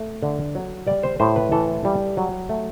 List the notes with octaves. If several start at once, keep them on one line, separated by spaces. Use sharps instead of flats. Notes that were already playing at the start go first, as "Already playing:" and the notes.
Already playing: A3
D3
F#3
G3 D5
C5
A2 C5
B4
E3 A4
G3
F#3
A3